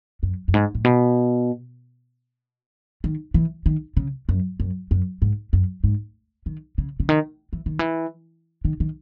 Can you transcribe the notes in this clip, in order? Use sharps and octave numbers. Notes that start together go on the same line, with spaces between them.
F#2
F#2
G#2
A2
B2
D#3
E3
D#3
C#3
F#2
F#2
F#2
G#2
F#2
G#2
D#3
C#3
C#3
D#3
E3
D#3
E3
D#3
D#3